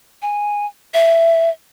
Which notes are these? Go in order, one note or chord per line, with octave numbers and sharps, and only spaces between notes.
G#5
E5